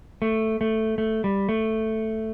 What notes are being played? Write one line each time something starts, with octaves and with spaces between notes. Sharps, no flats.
A3
A3
A3
G3
A3